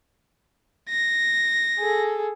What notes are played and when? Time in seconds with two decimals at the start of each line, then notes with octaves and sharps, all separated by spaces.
0.89 A#6
1.79 G#4 A4